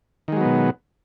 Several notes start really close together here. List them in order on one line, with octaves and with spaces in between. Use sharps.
D#3 G#3 F#3 B3 B2